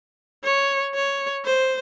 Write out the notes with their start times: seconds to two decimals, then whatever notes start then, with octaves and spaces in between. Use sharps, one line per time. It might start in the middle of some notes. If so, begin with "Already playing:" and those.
0.44 C#5
0.94 C#5
1.45 C5